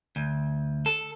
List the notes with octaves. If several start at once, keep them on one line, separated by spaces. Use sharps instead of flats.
D2
A4